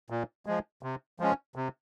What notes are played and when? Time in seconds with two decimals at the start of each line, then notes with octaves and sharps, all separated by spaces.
0.10 A#2
0.46 F3 G#3
0.83 C3
1.20 F3 G#3 C#4
1.56 C3